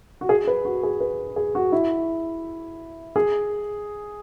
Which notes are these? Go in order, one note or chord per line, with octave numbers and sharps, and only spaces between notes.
F#4
G#4
B4
F#4
G#4
B4
G#4
F#4
E4
G#4